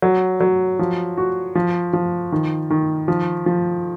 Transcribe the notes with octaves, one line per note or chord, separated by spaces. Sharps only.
F#3
F#3
F3
F#4
F3
F3
D#3
D#3
F3
F3